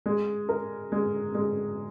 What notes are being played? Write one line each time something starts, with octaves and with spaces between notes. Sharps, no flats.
G#3
A#4
G#3
G#3